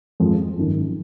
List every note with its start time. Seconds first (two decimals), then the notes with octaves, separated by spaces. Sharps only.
0.20 F2 F3 G#3
0.56 G#1 F#2 D#3